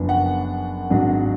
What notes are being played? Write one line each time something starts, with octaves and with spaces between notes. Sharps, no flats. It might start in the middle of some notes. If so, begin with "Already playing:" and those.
Already playing: F#1 F#2 F3 B3 D4
F#5
G#1 G#2 F#3 D4